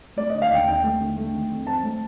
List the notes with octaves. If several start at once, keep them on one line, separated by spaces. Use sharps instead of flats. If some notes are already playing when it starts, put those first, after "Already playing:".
A3 D5
D3 D#5
F5
D#2 G5
D#2 G5
A3
D3
A3
D#3
F2
C4 A5
A3